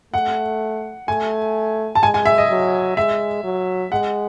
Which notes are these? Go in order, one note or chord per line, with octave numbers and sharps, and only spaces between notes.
A3 F#5
A3 G#5
A5
G#3 G#5
G#5
E5
D#5
F#3
G#3 E5
F#3
G#3 F#5